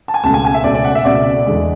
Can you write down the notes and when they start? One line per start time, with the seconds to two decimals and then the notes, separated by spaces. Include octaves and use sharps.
0.08 A5
0.14 G#5
0.24 C#2 B2 A3 A5
0.34 G#5
0.45 G#5
0.54 E5
0.64 C#2 B2 A3 D5
0.74 D5
0.85 F#5
0.95 E5
1.05 C#2 B2 A3 D5
1.45 E2 D3 G#3